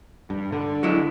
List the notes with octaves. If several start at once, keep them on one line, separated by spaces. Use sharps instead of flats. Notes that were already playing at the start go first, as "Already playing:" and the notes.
G2
D3
F#3 G#3 E4